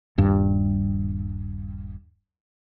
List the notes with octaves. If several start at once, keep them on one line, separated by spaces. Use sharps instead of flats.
D#1 G2